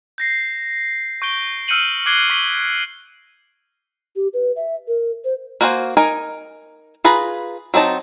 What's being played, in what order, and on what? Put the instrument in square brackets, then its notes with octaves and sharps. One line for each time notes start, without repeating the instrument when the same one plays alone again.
[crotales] G6 A#6 C7
C#6 G6 D7 G7
E6 F6 G6 C#7 D#7 F#7
D6 F#6 G#6 C7 D7 G7
C#6 B6 F#7 G7
[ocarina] G4
B4
E5
A#4
C5
[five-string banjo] A#3 F#4 A#4 C5 G#5
D#4 A#4 G#5
F4 G#4 B4 A#5
F#3 C4 D#4 A5